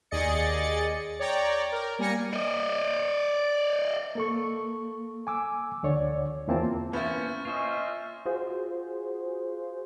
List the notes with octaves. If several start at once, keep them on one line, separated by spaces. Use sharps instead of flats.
D#2 G#4 D5 D#5 A6 C#7
C#5 D5 G5 A#5
A#4
G3 A#3 G#5 A#6 C#7
D5 D#5
A#3 A4 C#6
G#5 D6 E6
D2 D3 C#5 D5
E2 E3 A#3 C4 F4 A5
A#3 B3 C#4 E4 C5 C#6 F6 A6
C#4 F4 C5 D#5 E5
F4 F#4 G#4 C5